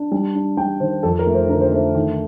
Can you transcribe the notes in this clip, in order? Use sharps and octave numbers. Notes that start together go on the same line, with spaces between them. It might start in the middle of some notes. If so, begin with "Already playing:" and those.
Already playing: D4
G3
D4
G3 G5
D#3 C5
F2 A4
A#4
A3
C5
D3 A#4
C5
A3 C5
D#3